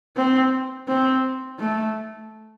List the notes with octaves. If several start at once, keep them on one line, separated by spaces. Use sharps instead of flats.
C4
C4
A3